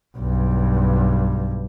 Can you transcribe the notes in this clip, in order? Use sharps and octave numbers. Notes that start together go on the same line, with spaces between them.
B1 G2